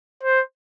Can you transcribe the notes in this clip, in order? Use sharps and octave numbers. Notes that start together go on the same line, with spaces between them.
C5